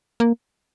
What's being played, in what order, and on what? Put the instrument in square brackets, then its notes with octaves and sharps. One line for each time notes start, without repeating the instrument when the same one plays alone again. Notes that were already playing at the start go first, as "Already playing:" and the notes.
[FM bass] A#3